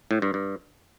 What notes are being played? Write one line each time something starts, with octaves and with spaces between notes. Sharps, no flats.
A2
G2
G2